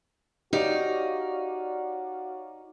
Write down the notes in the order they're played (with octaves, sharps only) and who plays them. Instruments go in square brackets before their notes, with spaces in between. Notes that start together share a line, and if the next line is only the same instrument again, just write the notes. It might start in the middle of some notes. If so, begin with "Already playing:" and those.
[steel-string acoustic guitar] D#4 [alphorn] F#4 [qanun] G4 [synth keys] C#5 D5 F5